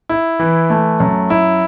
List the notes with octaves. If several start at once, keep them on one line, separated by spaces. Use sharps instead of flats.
E4
E3
A3
F#2
E4